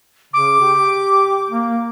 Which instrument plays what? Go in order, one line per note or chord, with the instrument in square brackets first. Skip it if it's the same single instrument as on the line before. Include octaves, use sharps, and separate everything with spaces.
[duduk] C#3 [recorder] D6
[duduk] G4
A#3